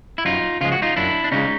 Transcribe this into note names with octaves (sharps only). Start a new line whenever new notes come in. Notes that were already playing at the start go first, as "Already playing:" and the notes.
E4
F#2 D#4 F4
C#3 F3 G#3 F4
F#4
D#4 F4
F#2 D4 E4
D4
C#3 F3 G#3 C#4 D#4